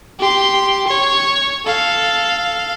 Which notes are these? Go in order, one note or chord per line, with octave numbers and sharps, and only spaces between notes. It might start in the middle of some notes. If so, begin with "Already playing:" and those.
G4 C6
C#5
A4 F5